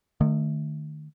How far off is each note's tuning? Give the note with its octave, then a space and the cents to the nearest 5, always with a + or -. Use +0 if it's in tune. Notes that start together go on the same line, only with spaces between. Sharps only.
D#3 -35 A3 +0